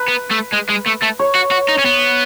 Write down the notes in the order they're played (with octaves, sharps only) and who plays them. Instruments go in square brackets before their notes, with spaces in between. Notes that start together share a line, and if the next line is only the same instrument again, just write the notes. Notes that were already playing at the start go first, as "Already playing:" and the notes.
Already playing: [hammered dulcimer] B4
[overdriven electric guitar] B3
A3
G#3
G#3
A3
A3
[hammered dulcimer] C#5
[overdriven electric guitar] F#4
F#4
D#4
C#4
B3